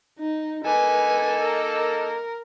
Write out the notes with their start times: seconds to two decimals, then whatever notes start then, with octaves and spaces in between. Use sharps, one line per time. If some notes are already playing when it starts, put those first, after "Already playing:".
0.19 D#4
0.64 A#3 D#4 A4 B4 G#5
1.40 A#4